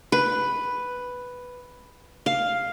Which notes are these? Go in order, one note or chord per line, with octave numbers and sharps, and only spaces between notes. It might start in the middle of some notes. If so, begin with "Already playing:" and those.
B4
F5